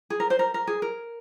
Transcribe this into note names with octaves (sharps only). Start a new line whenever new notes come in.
G#4
A#4
C5
A#4
A#4
G#4
A#4